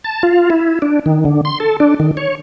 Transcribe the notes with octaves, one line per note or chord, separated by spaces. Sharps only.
A5
F4
E4
D4
D#3
D3
C6
A4
D4
D#3
C#5